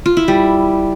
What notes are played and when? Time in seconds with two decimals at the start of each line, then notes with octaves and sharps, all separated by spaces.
0.06 F4
0.17 E4
0.28 G3